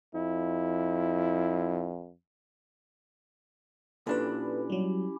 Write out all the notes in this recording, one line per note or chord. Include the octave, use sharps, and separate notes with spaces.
F2 E4
A#2 C#4 D4 E4 G4 A4 B4
F#3 G3